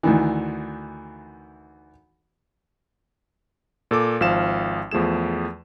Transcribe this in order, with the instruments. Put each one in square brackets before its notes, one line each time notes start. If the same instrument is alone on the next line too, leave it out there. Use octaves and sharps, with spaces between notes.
[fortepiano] D2 D#3 E3
[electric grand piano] A#2 A4 D6
G#1 F3 F5 E7
E2 F3 A3 G#4 E7